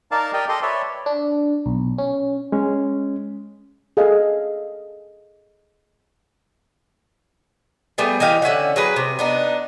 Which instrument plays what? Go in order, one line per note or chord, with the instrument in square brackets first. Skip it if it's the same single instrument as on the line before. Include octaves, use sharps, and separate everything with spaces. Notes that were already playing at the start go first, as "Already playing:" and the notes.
[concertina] D#4 A#4 D5 F5 A5
G4 A#4 D5 D#5 G5
G4 A4 D#5 C6
B4 C#5 D5 E5
[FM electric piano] D4
B1
C#4
[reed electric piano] G#3 C#4
[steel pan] G#4 A4 D#5 F5
[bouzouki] G3 A3 B3 G#4
E3 D#4 G4 F5
D3 C#4 E5 F#5
F#3 G#4 B4
C3
B3 D4 D#4